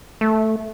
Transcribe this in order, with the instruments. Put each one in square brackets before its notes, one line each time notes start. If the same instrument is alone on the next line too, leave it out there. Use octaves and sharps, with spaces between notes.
[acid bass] A3